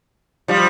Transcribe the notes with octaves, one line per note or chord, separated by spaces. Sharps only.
F3 G3